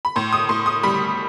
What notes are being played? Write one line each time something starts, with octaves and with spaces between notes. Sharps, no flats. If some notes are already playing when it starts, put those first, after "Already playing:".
B5
A2 C6
D#6
A2 C6
D#6
G3 B5